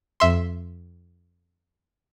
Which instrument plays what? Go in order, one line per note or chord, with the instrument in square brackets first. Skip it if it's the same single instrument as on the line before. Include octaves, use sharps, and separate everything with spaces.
[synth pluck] F2 E5 C6